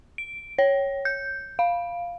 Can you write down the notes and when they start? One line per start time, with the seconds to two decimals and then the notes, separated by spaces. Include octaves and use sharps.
0.18 D7
0.58 C#5
1.05 G6
1.59 F5